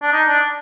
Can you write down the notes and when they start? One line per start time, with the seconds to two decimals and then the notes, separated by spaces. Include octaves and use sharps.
0.02 D4
0.12 D#4
0.28 D4